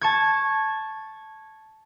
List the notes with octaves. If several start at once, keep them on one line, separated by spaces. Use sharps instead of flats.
A5 C#6 G#6